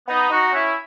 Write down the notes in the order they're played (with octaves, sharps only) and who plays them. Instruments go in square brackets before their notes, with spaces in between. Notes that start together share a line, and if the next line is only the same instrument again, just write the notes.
[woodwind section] B3 D#4
D#4 F#4
C#4 E4